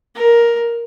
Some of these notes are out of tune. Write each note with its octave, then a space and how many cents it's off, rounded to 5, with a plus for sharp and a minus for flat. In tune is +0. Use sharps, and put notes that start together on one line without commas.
A#4 +10